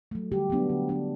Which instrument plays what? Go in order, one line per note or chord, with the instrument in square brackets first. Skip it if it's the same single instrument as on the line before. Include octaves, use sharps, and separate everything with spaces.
[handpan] F#3 A3
D3 G3 G4
F#3 B3 D4
D3
F#3 B3 D4